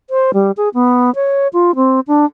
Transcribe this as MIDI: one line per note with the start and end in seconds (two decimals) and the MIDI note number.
0.10 0.31 72
0.34 0.51 55
0.57 0.69 68
0.74 1.13 59
1.15 1.48 73
1.53 1.76 65
1.76 2.00 60
2.07 2.25 62